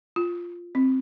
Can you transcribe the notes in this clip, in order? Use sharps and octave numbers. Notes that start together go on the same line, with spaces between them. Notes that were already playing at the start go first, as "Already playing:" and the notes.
F4
C4